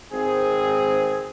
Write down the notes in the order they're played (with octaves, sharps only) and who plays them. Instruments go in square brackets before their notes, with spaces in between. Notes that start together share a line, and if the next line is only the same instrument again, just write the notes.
[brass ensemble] G#1 C4 G#4